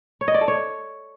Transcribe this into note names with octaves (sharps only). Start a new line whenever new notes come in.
C#5
D#5
D5
A4
C#5